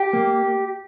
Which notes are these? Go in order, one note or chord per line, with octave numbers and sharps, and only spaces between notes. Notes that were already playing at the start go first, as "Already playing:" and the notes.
Already playing: G4
A#3